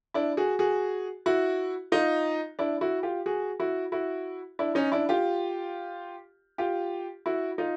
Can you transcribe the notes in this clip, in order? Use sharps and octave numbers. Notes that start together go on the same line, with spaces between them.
D4 E4
F#4 G#4
F#4 G#4
E4 F#4
D#4 F4
D4 E4
E4 F#4
F4 G4
F#4 G#4
E4 F#4
E4 F#4
D4 E4
C#4 D#4
D4 E4
F4 G4
F4 G4
E4 F#4
D#4 F4